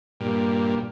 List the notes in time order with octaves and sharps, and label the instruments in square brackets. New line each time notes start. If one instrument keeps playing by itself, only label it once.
[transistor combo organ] G2 A#2